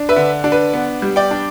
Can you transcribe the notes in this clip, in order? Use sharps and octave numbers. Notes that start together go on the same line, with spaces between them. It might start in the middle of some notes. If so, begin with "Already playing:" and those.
Already playing: D4
B4 E5
D3
D4
B4
B3
G3
D5 G5
D4